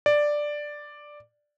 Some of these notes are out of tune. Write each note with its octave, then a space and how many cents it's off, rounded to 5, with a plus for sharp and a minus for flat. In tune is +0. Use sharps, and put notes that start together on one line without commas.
D5 +5